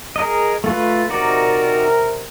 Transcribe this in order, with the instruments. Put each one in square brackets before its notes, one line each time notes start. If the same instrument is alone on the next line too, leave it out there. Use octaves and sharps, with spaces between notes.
[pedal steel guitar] G#4 A#4 D#5
A3 F4 B4
[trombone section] C3 A#4 [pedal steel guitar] D#4 F#4 D5